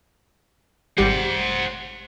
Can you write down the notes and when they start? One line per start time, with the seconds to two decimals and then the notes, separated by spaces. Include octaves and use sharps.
0.98 G#1 G3 G4 C5 F#5